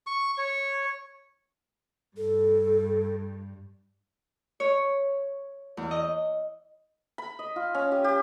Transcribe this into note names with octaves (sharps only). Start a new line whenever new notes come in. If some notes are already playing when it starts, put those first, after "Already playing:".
C#6
C#5
G2 A4
C#5
E2
D#5
B5
D#5
F4
C#4
G4
G4